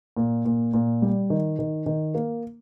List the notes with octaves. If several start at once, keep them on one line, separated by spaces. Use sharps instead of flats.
A#2
A#2
A#2
G3
D#3
D#3
D#3
A#3